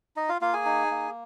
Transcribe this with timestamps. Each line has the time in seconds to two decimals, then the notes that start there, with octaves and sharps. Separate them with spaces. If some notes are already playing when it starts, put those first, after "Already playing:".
0.16 D#4 D#5
0.29 F4 F5
0.41 A#3 F4 F5
0.54 G#4 G#5
0.66 D#4
0.91 A#3